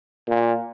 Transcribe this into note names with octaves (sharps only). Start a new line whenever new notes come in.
A#2